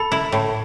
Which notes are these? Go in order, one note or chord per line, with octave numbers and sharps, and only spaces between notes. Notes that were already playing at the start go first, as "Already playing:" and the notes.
Already playing: A4 B5
E4
A2